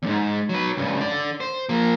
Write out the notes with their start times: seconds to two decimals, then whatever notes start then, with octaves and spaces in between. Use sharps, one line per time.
0.03 E2 G#2
0.49 F#3 B4
0.77 C#2 G2
1.00 D3 D5
1.40 C5
1.69 F3 A#3